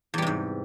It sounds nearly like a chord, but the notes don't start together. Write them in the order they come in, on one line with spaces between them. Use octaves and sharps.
E2 G3 C3 G#2